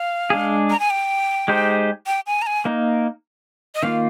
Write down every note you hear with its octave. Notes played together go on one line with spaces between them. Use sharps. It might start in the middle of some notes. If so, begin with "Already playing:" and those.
Already playing: F5
G#3 D4 G#4
A#5
G#5
G5
G#3 D#4 G4 C5
G5
G#5
A#5
G#5
A#3 D#4 A#4
D#5
D#3 A#3 F4 F5